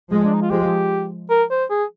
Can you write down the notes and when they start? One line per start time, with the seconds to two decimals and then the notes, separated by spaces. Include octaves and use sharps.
0.11 F3 G#3
0.25 D4
0.34 D#4
0.42 F4
0.50 F3 G#3 G4
1.30 A#4
1.51 C5
1.70 G#4